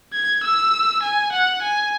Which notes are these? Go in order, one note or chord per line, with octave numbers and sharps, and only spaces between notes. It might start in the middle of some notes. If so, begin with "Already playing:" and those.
G#6
E6
G#5
F#5
G#5